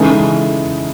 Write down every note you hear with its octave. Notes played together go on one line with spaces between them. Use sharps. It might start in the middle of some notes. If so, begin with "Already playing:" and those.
Already playing: C#3 E3 G#3 D#4 A4